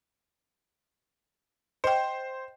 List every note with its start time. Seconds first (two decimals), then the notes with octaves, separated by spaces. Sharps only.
1.84 C5 D#5 G5